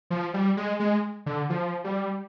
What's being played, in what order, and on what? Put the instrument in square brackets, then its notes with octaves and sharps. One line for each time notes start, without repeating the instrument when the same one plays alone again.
[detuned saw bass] F3
G3
G#3
G#3
D3
F3
G3